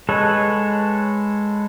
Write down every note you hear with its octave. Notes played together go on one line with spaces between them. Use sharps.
G#3 A4 B4 C#5